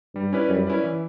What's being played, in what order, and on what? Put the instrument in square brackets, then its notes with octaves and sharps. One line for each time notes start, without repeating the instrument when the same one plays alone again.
[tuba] G2 [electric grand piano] G3
[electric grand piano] C#4 E4 B4 D5
[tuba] F#2 [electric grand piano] G3
[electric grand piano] C#4 E4 B4 D5
E3